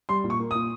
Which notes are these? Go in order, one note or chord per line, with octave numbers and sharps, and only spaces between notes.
G3 C6
A#2
C#6
A#3
A#2 D#6